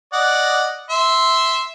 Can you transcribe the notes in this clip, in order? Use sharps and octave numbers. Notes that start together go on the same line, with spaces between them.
D5 D#5 F#5
E5 C6